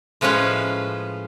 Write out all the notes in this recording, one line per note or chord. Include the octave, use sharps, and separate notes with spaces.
A2 F3 G#3 C#4 B4 F5